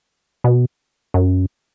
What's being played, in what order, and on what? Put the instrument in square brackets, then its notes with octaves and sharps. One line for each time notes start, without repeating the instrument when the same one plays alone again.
[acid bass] B2
F#2